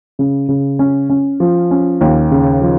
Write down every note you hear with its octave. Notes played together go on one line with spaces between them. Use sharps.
C#3
C#3
C#4
C#4
F3
C#4
D#2
C#3
F3